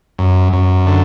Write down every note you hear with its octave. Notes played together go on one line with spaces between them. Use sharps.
F#2
F#2
D3